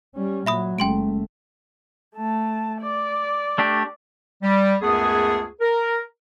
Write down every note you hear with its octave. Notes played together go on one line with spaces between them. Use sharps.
G3 C#4
A#2 F#3 E5 B5 D#6
F#1 G#3 A3 C#4 G5 C6 D7
A3 A5
D5
A3 D4 G4
G3
C#2 F#2 A3 B3 G#4
A#4